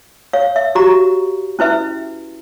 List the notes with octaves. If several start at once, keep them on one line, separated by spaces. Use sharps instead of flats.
C#5 F5
E5
F#4 G4 A#5
C#4 E4 B4 E5